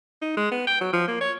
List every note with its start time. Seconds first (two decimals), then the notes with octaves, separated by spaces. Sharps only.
0.22 D#4
0.37 G#3
0.51 B3
0.67 G5
0.81 F#3
0.93 F3
1.08 A#3
1.21 C#5